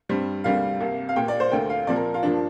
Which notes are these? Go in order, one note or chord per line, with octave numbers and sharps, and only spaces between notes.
G2 G3 C4
D2 C3 G3 A#3 F5
C2 C3 A#3
F5
A#2 A#3 G5
D5
C5
D2 D3 A#3 G5
F5
A#2 F3 C4 D5
A#4
F4
G2 F3 A#3 D4